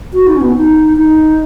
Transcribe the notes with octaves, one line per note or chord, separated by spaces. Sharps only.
F#4
D#4
C#4
B3
D#4
D#4